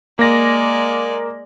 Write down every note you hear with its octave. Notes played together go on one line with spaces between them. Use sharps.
G#3 A#3 D5 A#6